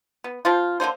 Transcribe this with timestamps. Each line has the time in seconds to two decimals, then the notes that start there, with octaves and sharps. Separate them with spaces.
0.24 B3
0.45 F3 C4 F4
0.80 D3 A#3 D#4 C5